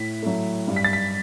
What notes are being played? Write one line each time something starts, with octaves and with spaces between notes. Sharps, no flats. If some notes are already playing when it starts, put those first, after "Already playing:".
Already playing: A2 B6
F#3 A3
G2
B6
A6
B6